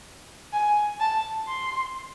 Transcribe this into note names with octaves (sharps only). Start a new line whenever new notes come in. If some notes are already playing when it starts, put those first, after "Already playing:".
G#5
A5
C6